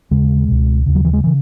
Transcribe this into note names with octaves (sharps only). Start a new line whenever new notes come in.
D#2 C#3 G#3
C#2 B2
D#2 C#3
F#3
E3
G#3
C#3 E3